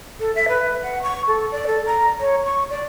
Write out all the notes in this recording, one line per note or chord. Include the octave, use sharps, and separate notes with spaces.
A4
E5
B4
F#5
C#6
A4
D5
A4
A#5
C#5
C#6
D5